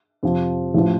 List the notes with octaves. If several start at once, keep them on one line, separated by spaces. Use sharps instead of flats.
F2 C3 F3
A1 A2 F3